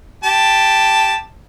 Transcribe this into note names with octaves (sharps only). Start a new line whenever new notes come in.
G4 A5